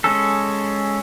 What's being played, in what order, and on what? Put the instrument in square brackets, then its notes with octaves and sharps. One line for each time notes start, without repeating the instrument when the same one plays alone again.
[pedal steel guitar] G#3 C#4 A4